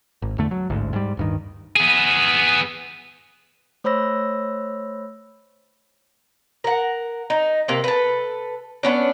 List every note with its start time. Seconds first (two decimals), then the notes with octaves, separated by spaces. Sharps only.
0.22 G#1
0.38 E2 D3 A3
0.51 F#3
0.70 A1 D2 G#2
0.93 G#2 G3
1.17 D1 G2 D#3
1.76 B3 G#4
3.84 A3 C5 C#5 B5 E6 A#6
6.64 A#4 F#5
7.30 D#4
7.68 C3 A#3
7.84 A4 B4
8.83 B3 C#4 D4